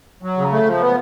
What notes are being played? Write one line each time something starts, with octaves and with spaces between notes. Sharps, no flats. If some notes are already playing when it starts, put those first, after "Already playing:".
F#3
C#3
A3
F3
B3